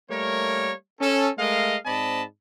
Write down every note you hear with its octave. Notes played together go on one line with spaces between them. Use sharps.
G3 A3 A#3 A#4 C#5
C#4 A4
G#3 A3 A#4 D#5 F5
G#2 C4 D5 D#5 A5 B5